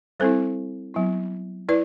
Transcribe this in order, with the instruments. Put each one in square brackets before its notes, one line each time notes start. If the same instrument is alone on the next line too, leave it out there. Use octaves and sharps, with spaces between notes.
[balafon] G3 C4 E4 A4 C5
F#3 B3 E4
E4 B4 D5